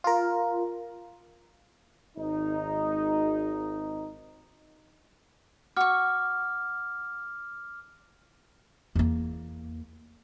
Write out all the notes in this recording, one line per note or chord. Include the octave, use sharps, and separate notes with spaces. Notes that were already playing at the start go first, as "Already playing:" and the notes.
F4 A#4
G#1 D#4
F#4 C#6 D6 F6
E2 A#3